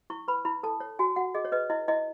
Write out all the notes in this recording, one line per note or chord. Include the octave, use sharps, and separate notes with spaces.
E4 C#6
B4 B5
E4 B5
A4 A5
C#5
F#4 G#5
F#4 F#5
G#4 D#5
C#5
B4 D#5
E4 D#5
E4 D#5